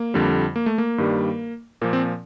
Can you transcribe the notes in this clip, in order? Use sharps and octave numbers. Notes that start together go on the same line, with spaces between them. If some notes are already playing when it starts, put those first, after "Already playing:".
Already playing: A#3
F2 D3 G3
A#3
A3
A#3
G2 D#3 G3
A#2 F3 A#3
C4